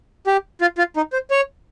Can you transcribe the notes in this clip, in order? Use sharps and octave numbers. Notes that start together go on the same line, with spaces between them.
G4
F4
F4
D#4
C5
C#5